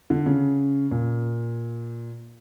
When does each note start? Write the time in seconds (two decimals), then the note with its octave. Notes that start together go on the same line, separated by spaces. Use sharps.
0.10 D3
0.26 C#3
0.91 A#2